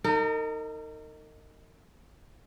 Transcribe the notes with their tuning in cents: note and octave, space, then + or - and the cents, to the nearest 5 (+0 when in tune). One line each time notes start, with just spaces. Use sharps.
D#4 +0 A#4 -40